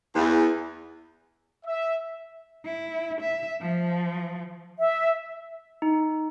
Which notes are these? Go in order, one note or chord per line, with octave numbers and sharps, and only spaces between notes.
E2
E5
E4
E5
F3
E5
D#4